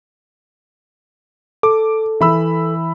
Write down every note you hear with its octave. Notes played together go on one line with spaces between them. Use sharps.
A4 D6
E3 E5 B5 E6